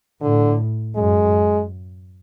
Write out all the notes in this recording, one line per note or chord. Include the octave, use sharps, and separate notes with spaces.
A2 D3
F#2 G#3